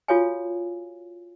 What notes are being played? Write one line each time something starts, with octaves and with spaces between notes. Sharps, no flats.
F4 F#4 A4 C#5 F5 G#5